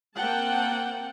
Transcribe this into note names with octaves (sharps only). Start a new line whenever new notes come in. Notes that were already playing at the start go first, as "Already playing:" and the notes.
A#3 C4 F#5 G5 A5